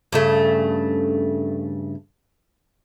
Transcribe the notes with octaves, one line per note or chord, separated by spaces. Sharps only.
G2 C#3 A3